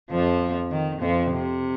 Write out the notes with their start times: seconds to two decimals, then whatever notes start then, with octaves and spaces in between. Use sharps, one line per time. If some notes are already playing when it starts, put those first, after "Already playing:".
0.11 F2 F3
0.71 D#3
1.01 F2 F3
1.32 C3